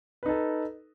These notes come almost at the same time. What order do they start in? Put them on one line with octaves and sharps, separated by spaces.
B4 D#4 A4